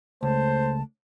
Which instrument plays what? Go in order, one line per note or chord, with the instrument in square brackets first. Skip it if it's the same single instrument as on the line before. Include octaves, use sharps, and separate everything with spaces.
[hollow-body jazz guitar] C#2 [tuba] A3 [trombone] C5 [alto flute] A5